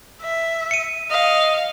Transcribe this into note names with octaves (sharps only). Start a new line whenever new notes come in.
E5
C#7 D#7
D#5 F5